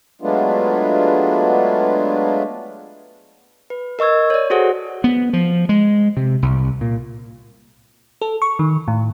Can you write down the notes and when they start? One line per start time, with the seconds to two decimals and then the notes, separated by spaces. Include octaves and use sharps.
0.22 F#3 G#3 A3 B3 D4 F4
3.70 B4
3.99 A#4 D#5 C#6 E6 G#6
4.30 C#5 D5
4.50 F#4 G#4 A4 C5 F#5
5.04 B3
5.33 F3
5.69 G#3
6.17 C3
6.42 C2
6.81 A#2
8.21 A4
8.42 C#6
8.59 D#3
8.88 A2